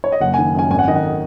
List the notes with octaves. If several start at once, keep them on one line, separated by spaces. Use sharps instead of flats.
C#5
D#5
F#1 F#5
G#5
D#3
F#2 G#5
G#1 G#5
F#5
D#3 D#5
F#5